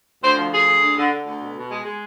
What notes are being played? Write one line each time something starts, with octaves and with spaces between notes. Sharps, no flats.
D2 C5
F3
D2 G#4
D2
D3
D3
D3
D2
B2
B2
G#3
G#3